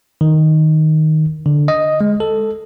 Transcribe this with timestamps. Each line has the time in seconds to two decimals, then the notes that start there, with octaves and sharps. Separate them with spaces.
0.21 D#3
1.46 D3
1.68 D#5
2.01 G#3
2.20 A4